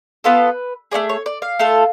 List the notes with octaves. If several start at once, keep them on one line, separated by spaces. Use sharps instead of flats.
B3 F4 A4 B4
A3 D4 G#4 D5
C#5
D5
F5
A3 F4 A4